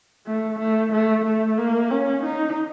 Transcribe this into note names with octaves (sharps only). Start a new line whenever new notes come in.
A3
A3
A3
A3
A#3
C#4
D#4